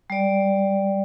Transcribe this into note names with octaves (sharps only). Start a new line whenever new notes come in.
G3 D5